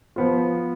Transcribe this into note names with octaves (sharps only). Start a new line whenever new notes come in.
F3 B3 F4